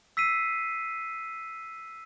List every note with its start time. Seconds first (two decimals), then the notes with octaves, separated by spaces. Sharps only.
0.17 E6 B6 C7 D#7